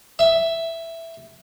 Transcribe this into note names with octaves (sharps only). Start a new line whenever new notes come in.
E5